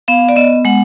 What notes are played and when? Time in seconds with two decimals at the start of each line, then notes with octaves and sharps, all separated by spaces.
0.08 B3 F5
0.29 D5
0.36 B3 D#5
0.65 G#3 F#5